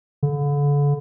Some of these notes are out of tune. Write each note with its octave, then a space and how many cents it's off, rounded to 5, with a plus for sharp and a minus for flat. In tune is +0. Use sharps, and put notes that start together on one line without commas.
D3 -35